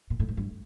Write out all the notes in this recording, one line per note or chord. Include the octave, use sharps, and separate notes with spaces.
A#2
A2
G#2
G2